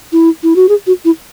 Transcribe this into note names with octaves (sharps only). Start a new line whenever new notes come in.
E4
E4
F#4
G#4
F#4
E4